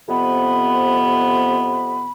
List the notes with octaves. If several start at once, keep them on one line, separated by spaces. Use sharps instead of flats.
F2 C3 B3 B5